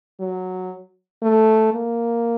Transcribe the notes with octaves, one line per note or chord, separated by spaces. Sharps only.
F#3
A3
A#3